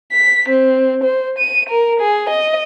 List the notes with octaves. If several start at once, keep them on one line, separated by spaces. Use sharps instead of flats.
B6
C4
C5
D#7
A#4
G#4
D#5